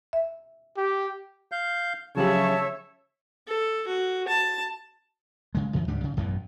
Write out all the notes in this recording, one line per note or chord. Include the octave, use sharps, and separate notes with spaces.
E5
G4
F5 G6
C#3 F3 F#3 G4 C#5 E5 A5
A4
F#4
A5
C#3 G#3
F#2 E3
C#2 G#2 G3 D4
C#3
A1 F#2 B2 E3